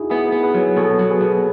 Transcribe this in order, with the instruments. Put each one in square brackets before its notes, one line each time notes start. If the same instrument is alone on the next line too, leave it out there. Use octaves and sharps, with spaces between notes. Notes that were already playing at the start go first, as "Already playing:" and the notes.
Already playing: [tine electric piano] D#4 E4 F#4 G#4
[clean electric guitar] B3 [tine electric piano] E4 G#4
[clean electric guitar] B3
[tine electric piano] G#4 B4
[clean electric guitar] F#3
[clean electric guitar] B2 [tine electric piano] A4 C#5
[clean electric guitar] F#3
[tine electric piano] G#4 B4
[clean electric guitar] B2